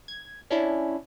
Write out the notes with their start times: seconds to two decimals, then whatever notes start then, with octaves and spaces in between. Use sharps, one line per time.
0.08 G#6
0.50 C#4 D4 E4